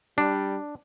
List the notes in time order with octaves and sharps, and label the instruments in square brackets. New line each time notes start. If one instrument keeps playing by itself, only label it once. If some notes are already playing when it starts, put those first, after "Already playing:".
[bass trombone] G3 [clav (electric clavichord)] D4